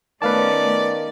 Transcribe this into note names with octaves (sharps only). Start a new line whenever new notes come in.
D#3 A3 B3 C#4 B4 D5 F5 A5